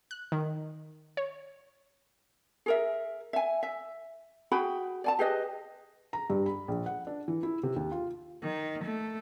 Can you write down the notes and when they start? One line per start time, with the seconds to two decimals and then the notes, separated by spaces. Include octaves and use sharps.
0.11 F#6
0.32 D#3
1.17 C#5
2.66 G#4 A#4 E5
3.33 E5 G#5
3.63 E5
4.51 F#4 G#4 G5 B5
5.04 D5 G#5 A5
5.19 G4 G#4 B4 D#5
6.13 A#5
6.30 G2
6.46 B5
6.68 A#1
6.86 F#5
7.07 D4
7.28 E3
7.43 E4
7.63 C3
7.76 D#2
7.92 F4
8.42 D#3
8.84 A3